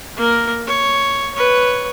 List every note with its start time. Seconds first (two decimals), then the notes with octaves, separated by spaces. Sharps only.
0.17 A#3 A#4
0.67 C#5
1.35 B4 C#5